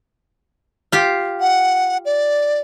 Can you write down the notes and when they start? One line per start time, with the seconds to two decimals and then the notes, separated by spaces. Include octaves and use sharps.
0.92 F4 G4
1.40 F#5
2.05 D5